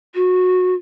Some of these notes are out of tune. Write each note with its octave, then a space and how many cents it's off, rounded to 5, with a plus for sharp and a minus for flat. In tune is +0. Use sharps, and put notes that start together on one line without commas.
F#4 -20